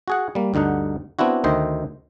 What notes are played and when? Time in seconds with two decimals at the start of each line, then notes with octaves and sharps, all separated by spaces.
0.08 F#4 G#4 F#5
0.35 G3 A#3
0.54 D2 G2 D3 D#4 F#5
1.19 B3 C4 D4 E4 F#4
1.44 D2 D#3 C5 D#5 E5